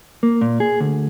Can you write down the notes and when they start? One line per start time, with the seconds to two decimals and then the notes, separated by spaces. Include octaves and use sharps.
0.23 A#3
0.41 A#2
0.60 G#4
0.80 D2